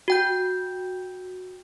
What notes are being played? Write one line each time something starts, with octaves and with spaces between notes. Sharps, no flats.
F#4 G5 G6